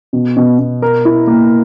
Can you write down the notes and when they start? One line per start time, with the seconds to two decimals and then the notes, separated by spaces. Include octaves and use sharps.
0.13 B2
0.37 B2
0.59 B2
0.82 A#4
1.05 E4
1.27 A#3